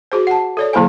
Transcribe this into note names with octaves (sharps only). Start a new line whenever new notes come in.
F#4 G#4 C5
F#5 A5
A4 C#5 D5
D3 F#3 A#3 E4 C5 G#5